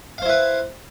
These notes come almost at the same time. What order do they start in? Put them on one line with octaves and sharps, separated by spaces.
F5 C5 E4 B4